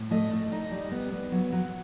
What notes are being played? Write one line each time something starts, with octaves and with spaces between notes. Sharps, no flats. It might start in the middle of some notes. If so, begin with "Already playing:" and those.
Already playing: A2
A3 D#5
A3
D#4 D#5
G3
B3
B3
F#3
F#3